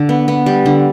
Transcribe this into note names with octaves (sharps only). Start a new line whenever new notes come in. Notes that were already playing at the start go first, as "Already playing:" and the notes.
Already playing: D3
B3
B3
G3
D3